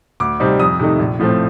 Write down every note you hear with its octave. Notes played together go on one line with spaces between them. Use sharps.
D2 D6
C3 G3 C4 D#4
F2 D#6
C3 D#3 A3 D#4
A#1
A2 F3 A3 C4